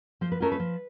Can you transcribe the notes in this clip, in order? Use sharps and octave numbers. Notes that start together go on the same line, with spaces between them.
F3 C5
B4
A3 C#4 F4 A#4
B4
F3